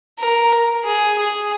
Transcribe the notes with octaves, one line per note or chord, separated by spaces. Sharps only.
A#4
G#4
G#4